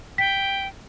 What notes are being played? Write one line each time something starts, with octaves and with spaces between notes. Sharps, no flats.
G5 B6